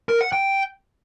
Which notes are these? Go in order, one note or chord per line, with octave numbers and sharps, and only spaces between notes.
A#4
F#5
G5